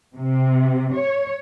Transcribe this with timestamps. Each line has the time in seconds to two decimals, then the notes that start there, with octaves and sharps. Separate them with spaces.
0.15 C3
0.95 C#5